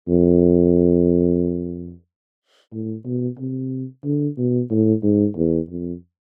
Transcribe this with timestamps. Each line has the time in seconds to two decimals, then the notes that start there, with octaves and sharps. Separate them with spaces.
0.08 F2
2.72 A2
3.05 B2
3.39 C3
4.05 D3
4.38 B2
4.71 A2
5.03 G#2
5.37 E2
5.70 F2